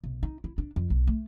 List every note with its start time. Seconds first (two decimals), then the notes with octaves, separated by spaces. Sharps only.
0.04 B1
0.23 D#4
0.44 E4
0.58 D4
0.76 F2
0.90 B1
1.07 A3